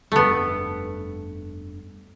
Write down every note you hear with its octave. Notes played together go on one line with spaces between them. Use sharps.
F1 G2 A3 B3